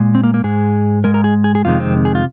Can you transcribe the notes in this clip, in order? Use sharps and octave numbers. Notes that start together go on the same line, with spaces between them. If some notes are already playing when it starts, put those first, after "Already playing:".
Already playing: A#2 G#3
C4
A#3
A#3
G#2 G#3 G#4
G#2 G#3 A#4
A#4
G#4
G#4
G#4
F2 C3 D#3 G#3 F4
C4
G#4
F4